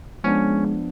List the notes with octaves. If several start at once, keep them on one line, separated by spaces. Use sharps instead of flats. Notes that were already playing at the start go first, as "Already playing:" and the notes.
F3 G#3 B3 C#4 D4